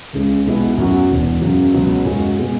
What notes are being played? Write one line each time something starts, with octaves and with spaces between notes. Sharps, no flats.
C#2 C#3 G#3
B1 B2 G#3 B3 E4
F#2 F#3 B3 F#4
E1 E2 B2
F#2 C#3 F#3
C#2 B2 F#3 B3
F#2 C#3 G#3 C#4 F#4
B2 G#3 B3